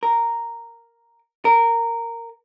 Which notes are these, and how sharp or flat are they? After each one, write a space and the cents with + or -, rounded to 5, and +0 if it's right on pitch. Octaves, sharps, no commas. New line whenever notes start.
A#4 -5
A#4 -10